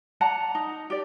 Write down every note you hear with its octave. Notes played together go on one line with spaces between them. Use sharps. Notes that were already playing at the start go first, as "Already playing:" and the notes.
D5 F#5 A5 A#5
D#4
G4 D5